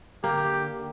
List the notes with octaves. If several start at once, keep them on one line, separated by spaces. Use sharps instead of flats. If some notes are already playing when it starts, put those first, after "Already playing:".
D3 A#3 G4